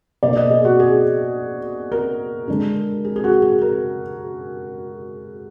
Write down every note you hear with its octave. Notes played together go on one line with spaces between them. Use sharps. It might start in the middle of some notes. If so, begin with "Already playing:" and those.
B2 A#3 D4 D5
D#5
G#4
F#4
G#4
A#4
D3 G#3 D4
G#4
G#4
F#4
G#4
A#4